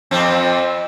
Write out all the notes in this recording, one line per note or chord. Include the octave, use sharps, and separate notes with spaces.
F2 F3 C4